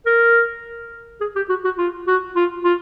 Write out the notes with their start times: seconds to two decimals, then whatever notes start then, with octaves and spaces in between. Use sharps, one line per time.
0.06 A#4
1.21 G#4
1.36 G4
1.49 F#4
1.65 F#4
1.78 F4
2.07 F#4
2.36 F4
2.64 F4